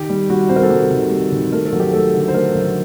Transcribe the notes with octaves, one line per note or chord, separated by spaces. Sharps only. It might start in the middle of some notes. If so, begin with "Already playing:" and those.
Already playing: D#3 G4
G3
G3 F#4
C3 C5
A#4
A4
G3 G4
D#3
G3
D#3
A3 A#4
A4
F#3
G4
A3 A4
D3
C5
A3 A#4
F#3